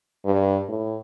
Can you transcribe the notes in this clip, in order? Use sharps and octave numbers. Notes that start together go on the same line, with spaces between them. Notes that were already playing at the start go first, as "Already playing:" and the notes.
G2
A2